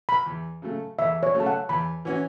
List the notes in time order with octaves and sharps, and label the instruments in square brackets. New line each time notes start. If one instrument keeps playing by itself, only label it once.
[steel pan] B5
[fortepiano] E2
C#3 F#3 A3
[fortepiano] E2 [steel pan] E5
[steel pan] C#5
[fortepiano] C#3 F#3 A3
[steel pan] A5
F#5
[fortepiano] E2 [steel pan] B5
[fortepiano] E3 C#4 F#4